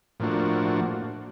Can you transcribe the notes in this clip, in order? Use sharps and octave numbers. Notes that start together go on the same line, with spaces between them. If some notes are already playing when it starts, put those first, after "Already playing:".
A2 F3 A#3 D4 F#4